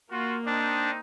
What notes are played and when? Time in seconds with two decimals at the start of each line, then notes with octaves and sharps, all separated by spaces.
0.11 A#3 F4 F#4
0.46 C4 D4 D#4